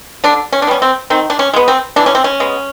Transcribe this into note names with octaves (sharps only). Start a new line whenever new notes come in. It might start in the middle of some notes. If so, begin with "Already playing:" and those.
D3 D4
C#4
D4
G3 B3 C#4
C4
D#3 C4
D4
C#4
G#3 B3
C4
E3 D4
C#4
C4
C#4
G#3 B3